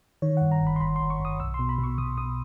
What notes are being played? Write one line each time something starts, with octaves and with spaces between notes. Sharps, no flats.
D#3 C#5
G2 F#5
A#5
G1
B5
C6
G1 B5
G1 C6
C#6
G1 D#6
B1 E6
C6
B2
B5
B2
C#6
B2 D#6
B2 D#6